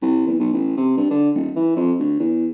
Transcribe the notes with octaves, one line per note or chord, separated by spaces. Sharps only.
C2
E2
B1
A1
C3
G2
D3
D#1
E3
F2
D2
E2